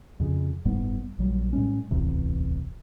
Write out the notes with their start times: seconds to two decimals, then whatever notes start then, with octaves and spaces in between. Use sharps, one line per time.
0.20 F2 C#3
0.65 F#1 G#2 G3 B3
1.19 A#1 F#3 G3
1.53 A2 G3 G#3 C#4
1.91 D1 A1 E2 C3